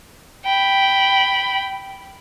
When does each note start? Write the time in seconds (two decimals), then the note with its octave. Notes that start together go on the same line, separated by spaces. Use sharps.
0.45 G5 B5